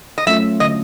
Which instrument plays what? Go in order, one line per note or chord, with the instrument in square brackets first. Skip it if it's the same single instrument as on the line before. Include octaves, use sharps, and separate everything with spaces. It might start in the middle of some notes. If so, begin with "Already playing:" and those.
[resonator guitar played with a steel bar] D#5
[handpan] F#3 A3 C#4 F4 [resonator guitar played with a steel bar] E5
[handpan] D3 [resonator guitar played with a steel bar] D#5